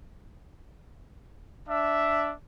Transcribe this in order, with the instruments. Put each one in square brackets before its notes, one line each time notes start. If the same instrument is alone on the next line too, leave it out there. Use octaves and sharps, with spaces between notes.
[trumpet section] D4 E5